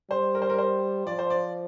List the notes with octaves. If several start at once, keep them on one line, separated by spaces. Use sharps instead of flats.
G3 C5
A#4
C5
A#4
C5
F3 D5
C5
D5